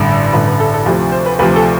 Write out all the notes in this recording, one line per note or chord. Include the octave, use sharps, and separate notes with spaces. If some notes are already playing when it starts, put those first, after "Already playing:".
Already playing: A1 G2 D3
A1 G2 D3 B4
B4
A4
A4
D2 C3 F3
C5
B4
D2 C3 F3 B4
A4